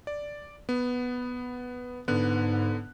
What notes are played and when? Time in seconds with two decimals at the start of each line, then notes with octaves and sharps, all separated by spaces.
0.07 D5
0.69 B3
2.08 G#2 D3 B3 F#6